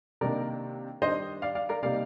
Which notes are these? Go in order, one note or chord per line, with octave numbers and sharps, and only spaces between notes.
C3 D#3 A#3 D4 A#4 D5
D#3 G3 D4 C5 D#5
D5 F5
D5 F5
A#4 D5
C3 G3 A#3 D#4 D5 F5